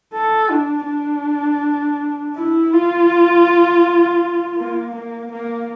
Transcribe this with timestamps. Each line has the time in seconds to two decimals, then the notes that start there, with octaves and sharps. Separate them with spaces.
0.13 A4
0.50 D4
0.87 D4
2.36 E4
2.73 F4
4.58 A#3
4.96 A#3
5.32 A#3